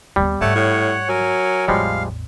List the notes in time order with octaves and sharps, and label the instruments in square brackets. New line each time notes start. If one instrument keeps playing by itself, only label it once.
[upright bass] D#2 B3 [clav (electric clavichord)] G3
[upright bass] G#2 D4 [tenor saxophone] A3 [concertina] C#5 F#5
[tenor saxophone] A2
[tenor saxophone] F#3 [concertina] A#4 G#5
[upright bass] A1 E2 [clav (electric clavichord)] F3 G3 G#3 [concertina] F5